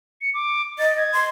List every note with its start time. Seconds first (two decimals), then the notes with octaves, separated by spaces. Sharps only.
0.21 C#7
0.34 D6
0.79 D#5 A6
0.97 G#6
1.13 C6